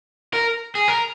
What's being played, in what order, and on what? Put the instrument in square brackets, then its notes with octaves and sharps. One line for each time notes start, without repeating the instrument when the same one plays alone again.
[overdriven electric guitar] A#4
G#4
A#4